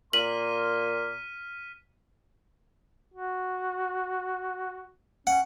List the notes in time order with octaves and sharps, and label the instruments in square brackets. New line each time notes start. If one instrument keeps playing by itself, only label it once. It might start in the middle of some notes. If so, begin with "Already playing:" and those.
[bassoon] A#2 [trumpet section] A#3 C6 [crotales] F6 B6 D#7 [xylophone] F#7
[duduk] F#4
[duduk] C#4 [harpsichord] F#5